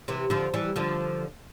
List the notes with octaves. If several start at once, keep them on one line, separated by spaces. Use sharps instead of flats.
C3 E3
D3 F3
E3 G3
D3 F3